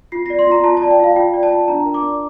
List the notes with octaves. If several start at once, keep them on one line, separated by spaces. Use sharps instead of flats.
F4 C7
D5 A#6
C6
F4 A#5
F4 A5
A5
D5
G5
F4 F5
F4 G5
D5
A5
F4
D4 A#5
A#4
D6
D5